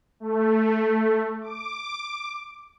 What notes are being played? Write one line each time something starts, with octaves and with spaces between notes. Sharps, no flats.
A3
D6